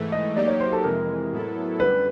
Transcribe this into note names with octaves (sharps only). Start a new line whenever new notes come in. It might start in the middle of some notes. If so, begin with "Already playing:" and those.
Already playing: G#2 E3 A3
D#5
F#3 A#3 D#4 G4 D5
C#5
C5
A4
F2 C3 E3 G#3 A#4
A2 F#3 B3 E4 A4
F#2 D3 G3 B4